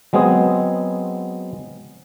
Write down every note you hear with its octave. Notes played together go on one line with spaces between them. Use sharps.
F#3 G#3 B3 C4 G#4